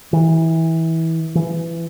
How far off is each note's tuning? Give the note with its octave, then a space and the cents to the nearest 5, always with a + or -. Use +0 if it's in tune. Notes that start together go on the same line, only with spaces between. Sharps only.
E3 -20
E3 +20